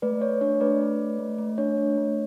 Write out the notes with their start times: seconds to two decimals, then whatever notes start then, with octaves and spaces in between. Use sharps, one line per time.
0.02 A3 B4 D5
0.21 A3 C#5
0.41 D4 C#5
0.60 A3 B4 D5
0.81 A3
0.99 A3
1.19 A3
1.38 A3
1.58 D4 C#5
1.78 A3
1.98 A3